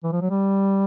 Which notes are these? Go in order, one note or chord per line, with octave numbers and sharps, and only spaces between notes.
E3
F3
F#3
G3